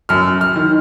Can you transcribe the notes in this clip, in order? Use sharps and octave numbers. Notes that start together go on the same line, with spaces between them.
F#2 F6
F6
D#3